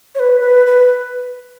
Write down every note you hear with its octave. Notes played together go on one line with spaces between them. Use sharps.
C#5
B4
B4
B4